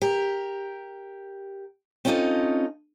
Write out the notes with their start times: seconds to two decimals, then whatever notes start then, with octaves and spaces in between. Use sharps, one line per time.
0.02 G4 A#4
2.05 C4 C#4 D#4 F4 A4 D#5